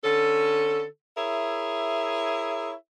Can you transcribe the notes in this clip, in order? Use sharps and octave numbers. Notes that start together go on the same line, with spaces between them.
D3 C#4 A4
E4 G#4 A#4 C#5 E5